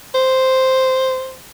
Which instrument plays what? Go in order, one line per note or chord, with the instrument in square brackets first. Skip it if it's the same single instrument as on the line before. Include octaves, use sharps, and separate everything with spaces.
[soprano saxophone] C5